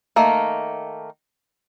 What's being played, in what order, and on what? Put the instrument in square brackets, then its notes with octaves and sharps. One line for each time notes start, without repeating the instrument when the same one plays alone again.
[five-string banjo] D#3 A3 A#3